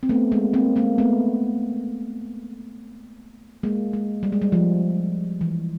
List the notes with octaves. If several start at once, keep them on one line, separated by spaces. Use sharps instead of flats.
C4
A3 B3
G#3 A#3
A#3 C4
G#3 A#3
A3 B3
G#3 A#3
G#3
G3
G#3
G3
F3
E3